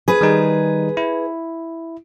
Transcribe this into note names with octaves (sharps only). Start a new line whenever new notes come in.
G#4 B4
D#3 G3 D#4
E4